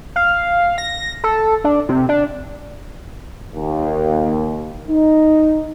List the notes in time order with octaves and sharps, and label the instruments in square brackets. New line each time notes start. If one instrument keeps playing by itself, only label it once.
[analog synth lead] F5
A#6
A4
D4
C3
D4
[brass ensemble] D#2
D#4